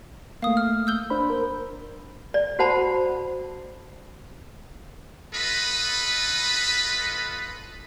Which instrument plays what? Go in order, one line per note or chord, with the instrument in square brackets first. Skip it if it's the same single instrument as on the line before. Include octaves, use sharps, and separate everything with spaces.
[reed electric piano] A3 A#3 [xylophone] F5 D#6
[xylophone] F6
E6 G6 G7
[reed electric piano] D4 C5 B5
A#4
[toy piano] D5
F#4 C5 F#5 A5 B5
[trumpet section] F4 A4 B4 D#5 B5